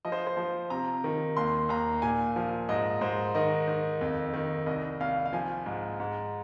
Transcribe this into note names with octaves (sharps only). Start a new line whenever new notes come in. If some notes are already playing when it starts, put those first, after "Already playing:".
F3 D#5
C5
C5
F3
C3 A#5
D#3
D#2 C6
D#2 A#5
A#2 G#5
F3
G#2 D#5
G#2 C5
D#3 D#5
D#3
F2
D#3
C2 D#5
C2 F5
F5
F3 G#5
G#2
G#2